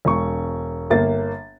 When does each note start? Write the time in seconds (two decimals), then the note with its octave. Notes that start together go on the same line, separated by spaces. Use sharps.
0.05 E1 C#6
0.90 G1 A#3 A6